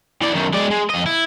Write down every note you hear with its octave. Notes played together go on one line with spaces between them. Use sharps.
E3 D5
F#2 D#3
G#3 D5
G#3
F2 D#5
E4